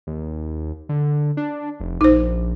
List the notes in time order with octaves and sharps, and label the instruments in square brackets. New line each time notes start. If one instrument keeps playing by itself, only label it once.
[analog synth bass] D#2
D3
D4
F1
[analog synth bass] A#1 [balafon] D#4 C5